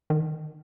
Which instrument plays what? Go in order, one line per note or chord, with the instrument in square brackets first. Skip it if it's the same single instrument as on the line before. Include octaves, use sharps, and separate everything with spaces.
[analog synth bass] D#3